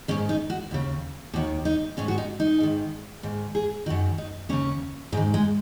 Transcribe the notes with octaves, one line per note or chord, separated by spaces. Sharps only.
G#2 D#3 C#4
D#4
F#4
D#2 C#3
D#2 D#3 F#4
D#4
G#2 D#3 C#4
F#4
D#4
D#4
G#2 D#3
G#2 D#3
G#4
F#2 D#3 F#4
D#4
D#2 C#3 C#4
G#2 D#3 G#3
G#3